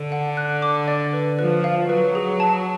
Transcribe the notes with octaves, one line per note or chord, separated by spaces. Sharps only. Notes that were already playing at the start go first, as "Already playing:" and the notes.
Already playing: D3
F#5
F#6
D6
D5
B4
F3 B4
F5
F#3 B4
G#4
A5